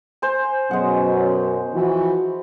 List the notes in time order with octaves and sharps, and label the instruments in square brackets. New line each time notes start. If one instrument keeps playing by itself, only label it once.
[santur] C5 G#5
[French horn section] F#2 B2 F#3 [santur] G#3 F#5
[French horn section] E3 F3 F#4